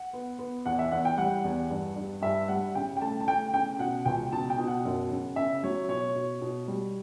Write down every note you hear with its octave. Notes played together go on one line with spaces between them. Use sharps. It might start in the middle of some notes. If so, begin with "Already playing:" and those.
Already playing: F#5
B3
B3
E2 F#5
E5
E2 F#5
G5
G3 F#5
E2
G2
G2
G2 E5
G3 F#5
C#3 G5
G5
A3 A5
A5
A3 G5
C#3 G5
B2 F#5
C#2 G5
B2 A5
G5
B2
F#5
F#2
C#3
C#3 E5
F#3 C#5
B2 C#5
B2
B2
G3